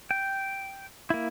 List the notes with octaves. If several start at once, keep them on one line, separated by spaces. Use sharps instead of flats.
G5
A#3 E4